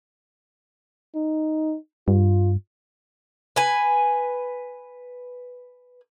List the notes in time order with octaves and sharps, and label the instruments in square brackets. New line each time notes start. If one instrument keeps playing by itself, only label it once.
[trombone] D#4
[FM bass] G2 [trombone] F4
[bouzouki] B4 G#5